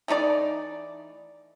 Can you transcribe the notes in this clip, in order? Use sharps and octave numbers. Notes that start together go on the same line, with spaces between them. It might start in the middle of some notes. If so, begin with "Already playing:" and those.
E3 A3 D#4 D5